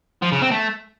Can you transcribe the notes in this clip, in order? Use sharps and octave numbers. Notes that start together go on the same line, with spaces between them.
F3
C#3
C4
A3